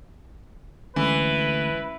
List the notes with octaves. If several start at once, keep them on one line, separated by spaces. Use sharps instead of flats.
D2 E3 G#3 A3 C#4 B4